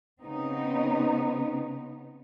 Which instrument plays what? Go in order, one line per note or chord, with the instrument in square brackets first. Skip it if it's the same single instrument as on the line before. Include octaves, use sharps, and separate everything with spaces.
[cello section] C#3 B3 C4 D#4